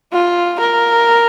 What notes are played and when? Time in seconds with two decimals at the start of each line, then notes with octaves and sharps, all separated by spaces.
0.12 F4
0.60 A#4